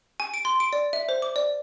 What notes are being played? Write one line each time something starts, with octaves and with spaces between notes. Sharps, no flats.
G#5
D7
C6
D7
D5
E5
C5
D6
D5